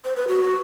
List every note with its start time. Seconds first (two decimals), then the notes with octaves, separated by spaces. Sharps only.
0.05 C5
0.16 B4
0.28 F#4